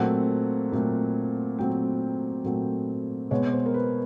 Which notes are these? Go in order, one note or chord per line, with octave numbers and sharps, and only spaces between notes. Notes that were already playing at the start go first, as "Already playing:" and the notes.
Already playing: A#2 F#3 A3 C4 F#5
A#2 F#3 A3 C4
A#2 F#3 A3 C4 G5
A#2 F#3 A3 C4
B2 G#3 B3 C#5
C5
A#4
B4